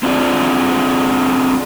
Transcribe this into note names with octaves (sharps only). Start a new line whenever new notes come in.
C4 D4 F4 F#4 G#4 D5